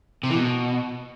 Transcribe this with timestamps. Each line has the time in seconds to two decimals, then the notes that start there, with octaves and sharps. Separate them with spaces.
0.23 C3
0.30 E3
0.36 B2